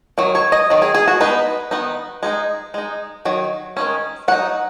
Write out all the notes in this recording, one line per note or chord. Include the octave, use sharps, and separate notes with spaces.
D#3 F#3
C#5
D#5
D#3 F#3
G#4
G#4
F#4
G#3 B3 D#4 B4
D#3 B3 D#4
G#3 B3 D#4
G#3 D#4
D#3 F#3
D#3 G#3 C#4
F#3 D#4 F#5